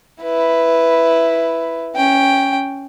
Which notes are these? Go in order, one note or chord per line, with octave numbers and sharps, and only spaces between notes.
E4 B4
C#4 G5